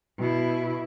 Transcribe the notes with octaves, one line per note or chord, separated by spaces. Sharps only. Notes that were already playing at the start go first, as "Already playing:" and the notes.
B2 E4